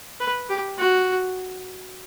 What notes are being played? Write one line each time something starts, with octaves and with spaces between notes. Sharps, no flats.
B4
G4
F#4